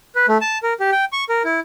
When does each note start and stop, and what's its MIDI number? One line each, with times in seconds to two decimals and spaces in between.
0.15 0.26 71
0.28 0.38 57
0.41 0.58 81
0.63 0.73 70
0.80 0.90 67
0.92 1.05 79
1.12 1.24 85
1.29 1.43 70
1.44 1.60 64